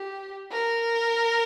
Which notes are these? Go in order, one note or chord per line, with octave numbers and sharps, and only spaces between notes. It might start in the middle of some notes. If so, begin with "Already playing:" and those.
Already playing: G4
A#4